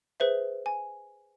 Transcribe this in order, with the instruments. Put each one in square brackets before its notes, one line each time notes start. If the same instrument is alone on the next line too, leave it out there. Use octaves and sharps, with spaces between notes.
[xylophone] G#4 B4 C5 E5
G#5